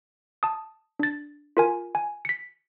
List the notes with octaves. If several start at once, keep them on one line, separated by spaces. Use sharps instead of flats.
A5 D#6
D4 A6
F4 A#4 G#5
G#5
B6 C#7